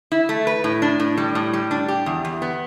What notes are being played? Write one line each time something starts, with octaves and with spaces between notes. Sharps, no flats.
E4
A3
B4
A2
D4
A2
G3
A2
G3
D4
G4
E2
E2
B3